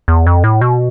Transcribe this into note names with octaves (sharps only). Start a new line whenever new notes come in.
E2
F2
A2
B2